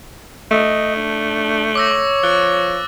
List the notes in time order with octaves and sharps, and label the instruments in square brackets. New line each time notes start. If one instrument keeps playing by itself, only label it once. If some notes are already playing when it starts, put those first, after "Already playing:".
[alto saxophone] A3 [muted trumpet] D#5
[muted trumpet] D4
[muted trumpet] C#5 [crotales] D6 E6 A#6
[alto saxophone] F3 [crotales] F#6 A6